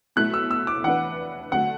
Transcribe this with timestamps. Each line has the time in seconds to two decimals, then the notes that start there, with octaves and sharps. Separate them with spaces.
0.16 B2 F#3 A3 E4 F#6
0.34 E6
0.51 E6
0.67 D6
0.84 E3 D4 B4 F#5
1.51 D3 F#3 A3 F#5